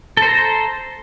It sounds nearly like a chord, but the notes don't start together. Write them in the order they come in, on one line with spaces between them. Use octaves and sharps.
A4 C5 A#5